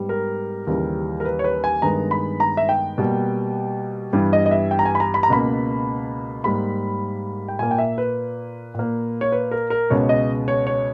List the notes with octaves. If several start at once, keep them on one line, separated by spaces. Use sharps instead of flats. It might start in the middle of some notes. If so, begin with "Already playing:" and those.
Already playing: G#2 G3 B3
A#4
D#2 C#3 E3 G3
A#4
B4
C#5
B4
G#5
G2 D#3 G#3 B3 A#5
B5
A#5
E5
G5
B2 G3 A#3
G2 E3 G3 B3
D#5
D#5
E5
G5
A#5
G#5
B5
A#5
B5
A#5
C#2 B2 A#3 B5
G#2 G3 A#3 B5
G5
A#2 A#3 G#5
G5
E5
B4
A#2 A#3
C#5
B4
A#4
A#4
C#2 B2 G#3 B3 C#5
D#5
C#5
C#5